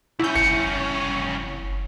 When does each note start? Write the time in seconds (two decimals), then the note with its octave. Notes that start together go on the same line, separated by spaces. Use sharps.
0.19 C2 C#4 E4 G6
0.35 F#1 C#7